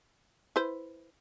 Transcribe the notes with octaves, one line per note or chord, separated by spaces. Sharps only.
E4 B4 C5